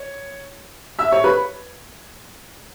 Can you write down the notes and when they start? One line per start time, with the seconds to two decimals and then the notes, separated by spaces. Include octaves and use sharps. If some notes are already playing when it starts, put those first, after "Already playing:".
Already playing: C#5
0.99 E5 E6
1.12 C#5 C#6
1.24 B4 B5